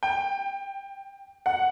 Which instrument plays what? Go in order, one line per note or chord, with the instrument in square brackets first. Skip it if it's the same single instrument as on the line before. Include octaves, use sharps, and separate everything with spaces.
[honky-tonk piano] G5
F#5